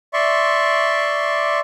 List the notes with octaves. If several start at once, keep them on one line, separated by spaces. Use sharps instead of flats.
D5 E5 C6 C#6